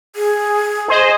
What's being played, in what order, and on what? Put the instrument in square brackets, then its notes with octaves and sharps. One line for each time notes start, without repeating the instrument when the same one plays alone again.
[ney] G#4
[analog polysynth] G#4 C5 D#5